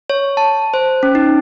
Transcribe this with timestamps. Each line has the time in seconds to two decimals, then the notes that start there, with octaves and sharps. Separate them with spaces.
0.10 C#5
0.37 A5
0.74 C5
1.03 C#4
1.15 D#4